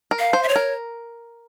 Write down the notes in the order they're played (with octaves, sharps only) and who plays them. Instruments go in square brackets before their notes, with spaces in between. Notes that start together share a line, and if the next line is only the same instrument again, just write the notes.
[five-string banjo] A#4
[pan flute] F5
[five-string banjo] C5
[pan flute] E5
C#5
[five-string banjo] A#4